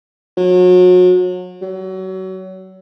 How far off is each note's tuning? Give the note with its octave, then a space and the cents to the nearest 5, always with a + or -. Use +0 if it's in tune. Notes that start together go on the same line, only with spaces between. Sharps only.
F#3 -35
F#3 +30